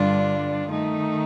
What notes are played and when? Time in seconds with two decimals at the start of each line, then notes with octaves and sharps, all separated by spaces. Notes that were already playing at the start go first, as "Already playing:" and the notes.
Already playing: G2 D3 G3 D4 F4
0.68 D#3 A3 D#4